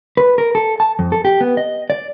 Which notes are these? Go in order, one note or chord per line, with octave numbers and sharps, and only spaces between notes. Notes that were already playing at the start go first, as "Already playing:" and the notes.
B4
A#4
A4
A5
F2
A4
G4
B3
D#5
D5